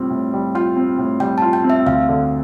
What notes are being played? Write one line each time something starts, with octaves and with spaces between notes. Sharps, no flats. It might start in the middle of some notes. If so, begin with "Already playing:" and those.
Already playing: A2 G3 C4 F4
A2
G3
F4 G5
C4
A2
G3 G5
A5
F4
G5
C4
E5
D2 F5
D3